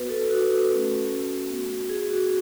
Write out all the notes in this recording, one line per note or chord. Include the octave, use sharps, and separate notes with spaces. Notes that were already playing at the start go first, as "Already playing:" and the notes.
Already playing: B3 F#4 B4
A4
F#4
A3 C#4 F#4
B3 F#4
G#4
F#4